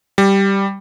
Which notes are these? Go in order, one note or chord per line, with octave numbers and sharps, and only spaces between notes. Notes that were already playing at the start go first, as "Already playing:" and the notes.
G3